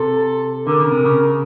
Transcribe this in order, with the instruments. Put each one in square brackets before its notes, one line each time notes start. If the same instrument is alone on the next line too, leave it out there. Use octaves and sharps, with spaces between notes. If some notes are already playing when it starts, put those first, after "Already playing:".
Already playing: [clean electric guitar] C3 [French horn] A4
[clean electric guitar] D3 [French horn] A#4
[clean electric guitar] C#3
C3
C#3